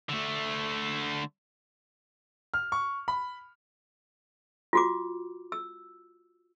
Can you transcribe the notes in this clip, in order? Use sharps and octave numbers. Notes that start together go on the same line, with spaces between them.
D3 A3
F6
C#6
B5
F4 F#4 D6
E6